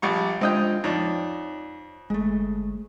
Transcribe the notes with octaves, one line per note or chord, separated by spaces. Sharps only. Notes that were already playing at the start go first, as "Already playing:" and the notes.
A#1 G3 C#6
G#3 C4 D4 F4 D#5 G5
F2 D#4 C#5 D5
G1 G#3 A3